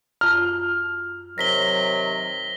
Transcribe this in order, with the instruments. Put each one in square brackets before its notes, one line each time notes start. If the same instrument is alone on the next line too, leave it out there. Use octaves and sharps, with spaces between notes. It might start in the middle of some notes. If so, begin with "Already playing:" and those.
[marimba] F#2 F4 A5 [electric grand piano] F6
[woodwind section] C3 D#3 F#3 [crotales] A#6 B6 G7